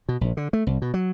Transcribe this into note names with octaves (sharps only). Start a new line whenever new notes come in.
B2
A#1
D3
A3
C2
B2
F#3